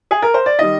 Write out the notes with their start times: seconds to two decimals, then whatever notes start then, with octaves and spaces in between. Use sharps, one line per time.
0.11 G#4
0.22 A#4
0.34 C5
0.46 D5
0.59 D#3 G3 D#5